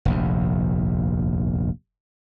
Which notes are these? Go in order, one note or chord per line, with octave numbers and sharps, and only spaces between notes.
F1 A#1 D#2